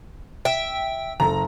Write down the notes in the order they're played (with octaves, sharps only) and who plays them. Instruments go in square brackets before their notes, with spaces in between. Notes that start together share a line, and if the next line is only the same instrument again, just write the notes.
[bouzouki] E5 [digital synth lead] G5
[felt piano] F#1 A4 [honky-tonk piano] A#5